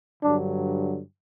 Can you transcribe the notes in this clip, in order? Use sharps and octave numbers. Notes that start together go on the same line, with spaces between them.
G2 D3 F#3 D4